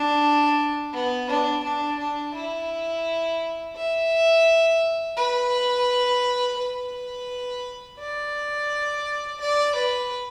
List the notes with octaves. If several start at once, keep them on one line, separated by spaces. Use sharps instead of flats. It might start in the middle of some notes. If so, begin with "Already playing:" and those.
Already playing: D4
B3
D4
D4
D4
E4
E5
B4
B4
D5
D5
B4